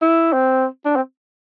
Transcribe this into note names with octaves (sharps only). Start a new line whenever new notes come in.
E4
C4
D4
C4